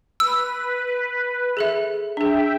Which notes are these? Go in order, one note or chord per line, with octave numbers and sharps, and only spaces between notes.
B4 E6
G#4 A4 E5
D4 G#4 E5 G5